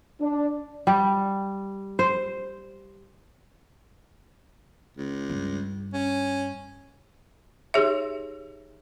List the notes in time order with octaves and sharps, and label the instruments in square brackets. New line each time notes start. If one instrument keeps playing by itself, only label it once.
[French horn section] D4
[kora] G3
C5
[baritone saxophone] C#2
[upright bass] G2
[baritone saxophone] C#4
[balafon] D#4 G4 G#4 C#5 E5